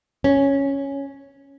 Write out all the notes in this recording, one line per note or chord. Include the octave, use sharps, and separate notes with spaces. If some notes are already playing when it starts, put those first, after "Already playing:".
C#4